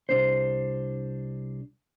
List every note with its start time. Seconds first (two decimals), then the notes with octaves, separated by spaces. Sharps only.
0.09 C2 D4 C5